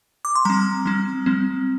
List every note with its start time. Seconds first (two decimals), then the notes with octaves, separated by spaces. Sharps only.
0.25 D6
0.36 C6
0.45 G3 C4 A#5
0.86 G3 C4
1.26 G3 C4